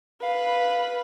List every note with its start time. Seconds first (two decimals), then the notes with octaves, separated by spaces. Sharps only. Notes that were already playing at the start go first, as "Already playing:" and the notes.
0.23 B4 F5